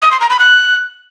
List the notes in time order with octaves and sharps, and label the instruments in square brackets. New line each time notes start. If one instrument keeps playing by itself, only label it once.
[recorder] D#6
C6
A#5
B5
F#6